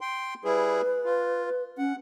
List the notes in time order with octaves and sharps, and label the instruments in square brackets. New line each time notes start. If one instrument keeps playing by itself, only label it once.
[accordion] G5 C6
[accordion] G3 E4 G#4 [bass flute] B4
[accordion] F4
[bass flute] C#4 [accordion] F#5